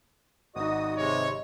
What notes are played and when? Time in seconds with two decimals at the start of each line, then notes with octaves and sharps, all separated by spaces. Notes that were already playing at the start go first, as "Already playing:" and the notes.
0.56 G#1 D#4 F#4 D#5 D#6
0.98 C3 G#3 C#5